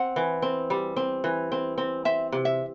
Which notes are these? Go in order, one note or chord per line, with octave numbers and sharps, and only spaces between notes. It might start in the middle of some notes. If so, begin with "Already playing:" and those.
Already playing: C4 F#5
E3
C4
G3
C4
E3
C4
C4
C4 E5
C3
E5